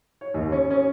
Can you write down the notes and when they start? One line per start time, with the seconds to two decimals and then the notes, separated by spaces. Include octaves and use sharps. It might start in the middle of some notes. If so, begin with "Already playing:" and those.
0.21 C#5
0.34 D#2
0.52 C#4
0.71 C#4